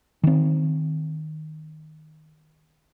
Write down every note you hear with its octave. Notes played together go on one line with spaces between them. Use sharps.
D#3 C4